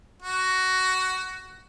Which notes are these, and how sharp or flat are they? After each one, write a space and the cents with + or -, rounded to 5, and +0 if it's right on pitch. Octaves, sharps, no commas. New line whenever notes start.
F#4 +15